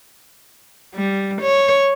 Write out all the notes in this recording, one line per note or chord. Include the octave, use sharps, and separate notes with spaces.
G3
C#5